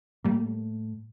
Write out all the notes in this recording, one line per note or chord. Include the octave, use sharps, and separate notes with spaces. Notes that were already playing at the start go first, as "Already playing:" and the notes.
A2 G3 A3 A#3